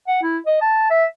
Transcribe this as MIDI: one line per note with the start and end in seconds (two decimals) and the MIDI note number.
0.07 0.19 78
0.22 0.38 64
0.46 0.59 75
0.61 0.85 81
0.90 1.05 76